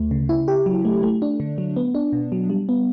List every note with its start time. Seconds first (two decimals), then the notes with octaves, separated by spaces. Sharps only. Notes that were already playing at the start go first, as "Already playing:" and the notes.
Already playing: D2 A3
0.11 C#3
0.29 E4
0.48 G4
0.66 F#3
0.85 A3
1.03 A3
1.22 D4
1.40 D3
1.58 F#3
1.76 B3
1.95 D4
2.13 B2
2.32 F#3
2.50 G3
2.69 B3